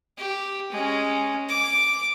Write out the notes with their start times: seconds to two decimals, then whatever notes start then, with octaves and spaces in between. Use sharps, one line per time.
0.18 G4
0.72 G#3 C#4
1.49 D6